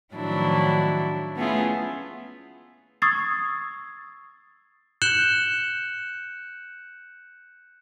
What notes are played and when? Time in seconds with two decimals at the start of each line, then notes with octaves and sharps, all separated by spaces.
0.13 A2 D#3 F3 F#3 D4 E4
1.38 A3 B3 C#4 E4 F4 G#4
3.02 C#6 D#6 E6 G#6 A6 C7
5.02 F#6 G6 C#7 E7 F#7 G7